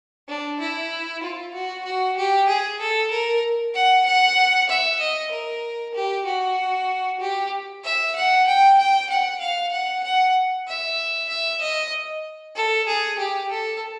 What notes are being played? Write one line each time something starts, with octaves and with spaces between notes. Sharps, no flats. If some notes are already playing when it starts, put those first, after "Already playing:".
D4
E4
F4
F#4
F#4
G4
G#4
A4
A#4
F#5
F#5
E5
D#5
A#4
G4
F#4
G4
E5
F#5
G5
G5
F#5
F5
F#5
F#5
E5
E5
D#5
A4
G#4
G4
A4